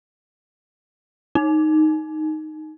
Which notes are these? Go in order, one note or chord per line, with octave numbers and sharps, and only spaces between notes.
D#4